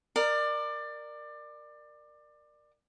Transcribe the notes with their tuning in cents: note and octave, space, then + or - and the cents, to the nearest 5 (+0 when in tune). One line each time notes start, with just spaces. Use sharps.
A#4 +0 D5 +25